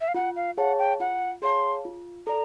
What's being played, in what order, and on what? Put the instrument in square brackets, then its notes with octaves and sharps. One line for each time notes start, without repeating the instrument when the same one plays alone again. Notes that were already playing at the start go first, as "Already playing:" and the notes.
[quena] E5
F5
[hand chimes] F4 [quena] F#5
[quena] F5
[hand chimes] G#4 C#5 F5 A5 [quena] F#5
[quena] G5
[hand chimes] F4 [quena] F#5
[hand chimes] G#4 C#5 F5 A5 [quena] C6
[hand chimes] F4
[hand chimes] A4 D5 [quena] A#5